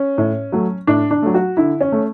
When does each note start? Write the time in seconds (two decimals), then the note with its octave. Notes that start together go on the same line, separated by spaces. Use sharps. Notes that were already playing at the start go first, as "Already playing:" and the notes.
Already playing: C#4
0.18 A2
0.52 F#3 A3
0.87 A2 D4
1.11 D4
1.22 F#3 A3
1.34 F#4
1.57 D3 E4
1.81 C#4
1.92 A3